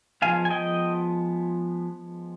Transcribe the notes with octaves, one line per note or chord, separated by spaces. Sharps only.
F3 G#3 B3 F5 G#5
G#5
D#5 G5